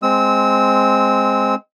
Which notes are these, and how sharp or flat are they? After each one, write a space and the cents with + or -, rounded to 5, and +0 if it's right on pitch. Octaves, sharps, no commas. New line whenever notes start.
G#3 +0 C4 +0 E6 -30